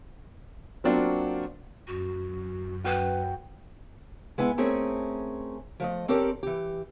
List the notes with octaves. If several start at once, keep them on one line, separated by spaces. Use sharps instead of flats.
F#3 A#3 C4 D4 F4 F#4
F#2 F#4
F#4 B4 G5
G#3 B3 E4 G#5
A3 C4 C#4 G#4 A#4
F3 A3 D#5
C4 C#4 G4 A4 A#4 D5
E3 G4